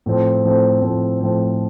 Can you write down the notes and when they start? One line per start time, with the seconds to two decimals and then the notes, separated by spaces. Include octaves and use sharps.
0.06 A2 F3 C4
0.44 A2 F3 C4
0.82 A2 F3 C4
1.20 A2 F3 C4